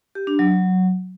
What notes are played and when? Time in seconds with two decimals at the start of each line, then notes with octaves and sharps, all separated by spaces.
0.15 G4
0.27 D4
0.39 F#3